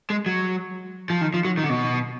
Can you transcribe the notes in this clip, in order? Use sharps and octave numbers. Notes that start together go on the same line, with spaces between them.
G#3
F#3
F3
D#3
F3
F#3
D#3
D3
B2